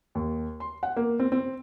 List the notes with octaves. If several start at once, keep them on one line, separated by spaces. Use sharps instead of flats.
D#2
C6
F#5
A#3
C4
C4